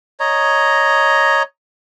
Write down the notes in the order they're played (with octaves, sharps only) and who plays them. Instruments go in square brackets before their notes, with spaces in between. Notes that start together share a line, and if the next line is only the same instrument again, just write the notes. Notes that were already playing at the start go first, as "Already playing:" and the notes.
[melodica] C#5 D#5 A#5